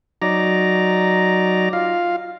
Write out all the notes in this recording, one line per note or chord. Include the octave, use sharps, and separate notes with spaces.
F#3 D#4 D5 A#5
F4 F5